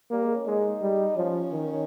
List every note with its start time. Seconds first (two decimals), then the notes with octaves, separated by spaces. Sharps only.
0.11 G3 A#3
0.23 G#3
0.34 C#4
0.47 G#3 D#4
0.81 G3
1.17 F3 C#4
1.52 D#3